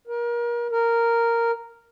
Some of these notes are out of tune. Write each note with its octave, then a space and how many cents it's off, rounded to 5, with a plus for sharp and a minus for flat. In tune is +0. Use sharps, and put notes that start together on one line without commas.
A#4 +30
A#4 -5